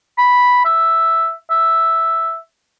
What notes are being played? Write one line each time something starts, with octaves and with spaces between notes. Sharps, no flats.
B5
E5
E5